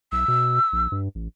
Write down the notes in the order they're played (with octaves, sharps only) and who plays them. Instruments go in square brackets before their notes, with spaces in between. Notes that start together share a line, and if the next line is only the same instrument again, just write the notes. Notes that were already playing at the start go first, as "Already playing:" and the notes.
[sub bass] B1 [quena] E6
[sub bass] B2
A#1
G2
A1